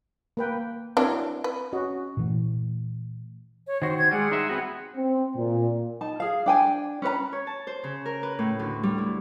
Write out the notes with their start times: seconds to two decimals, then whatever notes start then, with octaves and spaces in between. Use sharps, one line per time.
0.37 A#3 B4 G5
0.97 E3 F#3 C4 D4 A#4
1.44 B4
1.73 C#4 F#4 D#5
2.17 A#2 E3 A3
3.66 C#5
3.82 D#3 F#4 C5
3.98 C5 G#6
4.11 G3 G#3 G#4 F#5
4.31 D#4 C5 E5
4.49 B3 C4 F#4
4.96 C4
5.36 A#2
6.01 D#4 A5
6.20 G#4 F5
6.46 D4 G5 G#5
7.02 C#4 B4 C5 A#5
7.33 C#5
7.47 A5
7.67 C5
7.84 C#3
8.06 A#4
8.23 B4
8.39 A2
8.59 D2
8.83 G3
8.98 E4